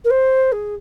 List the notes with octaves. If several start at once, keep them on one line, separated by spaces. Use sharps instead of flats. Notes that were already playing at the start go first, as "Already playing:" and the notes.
A#4
C5
G#4